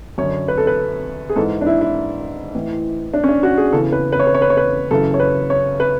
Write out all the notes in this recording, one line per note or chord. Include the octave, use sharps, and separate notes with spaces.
F#2 D3 C#5
B4
A4
B4
G#4
G#2 E3 A4
D4
E4
E4
A2 E3
D4
C#4
D4
F#4
G#4
E2 C#3 E3 A4
B4
B4
C#5
B4
C#5
B4
C#5
B4
F#2 C#3 E3 A4
C#5
B4
C#5
B4